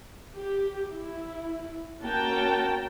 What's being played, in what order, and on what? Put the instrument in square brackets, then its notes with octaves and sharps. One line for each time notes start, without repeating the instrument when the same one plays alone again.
[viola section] G4
E4
A#3 C#4 F#4 G5 A5 A#5